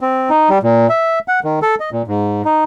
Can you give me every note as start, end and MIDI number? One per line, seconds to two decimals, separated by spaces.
0.01 0.30 60
0.30 0.49 63
0.50 0.58 55
0.63 0.87 46
0.89 1.19 76
1.28 1.40 78
1.44 1.59 51
1.62 1.75 69
1.80 1.90 75
1.92 2.02 46
2.08 2.42 44
2.45 2.64 63